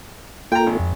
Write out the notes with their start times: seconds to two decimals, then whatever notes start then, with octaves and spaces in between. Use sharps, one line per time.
0.52 A#3 F4 A4 G5 A#5
0.66 G#1
0.79 F2